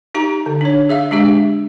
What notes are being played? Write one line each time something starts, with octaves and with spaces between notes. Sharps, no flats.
D#4 G4 A#5
D3
D4 C#5
G#4 E5 F5
G#3 D4 G4 E5